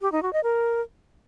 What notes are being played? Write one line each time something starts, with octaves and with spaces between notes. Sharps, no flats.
G4
D#4
F#4
D#5
A#4